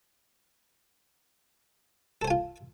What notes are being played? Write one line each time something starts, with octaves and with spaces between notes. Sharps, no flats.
F4 A4 C5 G#5